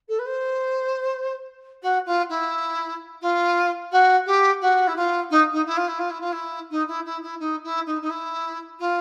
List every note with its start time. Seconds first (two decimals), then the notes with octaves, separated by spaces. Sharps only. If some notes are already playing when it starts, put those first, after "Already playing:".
0.08 A4
0.19 B4
0.26 C5
1.82 F#4
2.06 F4
2.29 E4
3.21 F4
3.91 F#4
4.26 G4
4.61 F#4
4.87 E4
4.96 F4
5.30 D#4
5.52 D#4
5.66 E4
5.77 F4
5.88 E4
5.98 F4
6.10 E4
6.20 F4
6.32 E4
6.70 D#4
6.87 E4
7.05 E4
7.22 E4
7.39 D#4
7.63 E4
7.86 D#4
8.01 D#4
8.09 E4
8.79 F4